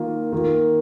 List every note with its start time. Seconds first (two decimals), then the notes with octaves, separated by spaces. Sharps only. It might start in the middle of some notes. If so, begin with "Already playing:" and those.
Already playing: D#3 A#3 F4
0.32 D#3 A#3 F4